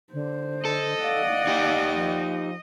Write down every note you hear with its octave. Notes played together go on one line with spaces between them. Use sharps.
D3 C5
A4 D#5
D5 F5 F#5
D#4 G4
F3